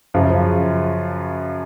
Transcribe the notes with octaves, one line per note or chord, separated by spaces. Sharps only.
F#2 C#3 F3